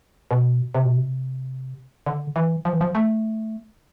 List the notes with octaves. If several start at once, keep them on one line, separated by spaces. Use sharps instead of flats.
B2
C3
B2
C3
D3
E3
F3
E3
F3
A3